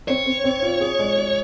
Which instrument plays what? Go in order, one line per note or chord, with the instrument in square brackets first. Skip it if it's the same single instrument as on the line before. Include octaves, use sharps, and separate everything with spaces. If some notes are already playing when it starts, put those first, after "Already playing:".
[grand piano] C4 [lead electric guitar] C#5
[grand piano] C4
C4
F4
G#4
G#3
G#4